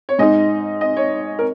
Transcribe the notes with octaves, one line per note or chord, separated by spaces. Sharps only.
C#5
G#2 G#3 D#4 D#5
D#5
C#5
A#4